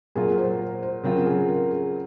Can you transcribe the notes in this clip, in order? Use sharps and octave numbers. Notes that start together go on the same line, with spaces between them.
A#2 F#3 A#3 F4 G#4
C5
C5
C#3 F#3 C4 F4 A#4
G#4
A#4
G#4